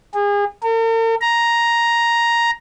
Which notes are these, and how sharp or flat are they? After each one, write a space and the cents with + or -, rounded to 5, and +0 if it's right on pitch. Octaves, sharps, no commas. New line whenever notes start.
G#4 -35
A#4 -45
A#5 +5